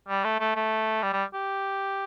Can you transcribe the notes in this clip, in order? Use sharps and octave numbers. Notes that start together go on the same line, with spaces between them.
G3
A3
A3
A3
G3
G3
G4